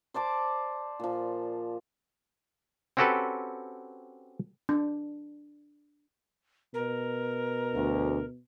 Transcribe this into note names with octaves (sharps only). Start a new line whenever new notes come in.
C5 D5 A5 D6
A#2 F3
C4 C#4 F#4 G4 A4 B4
D4
B2 A#4
D2